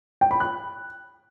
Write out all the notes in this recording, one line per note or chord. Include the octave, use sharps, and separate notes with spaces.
G5
B5
F#6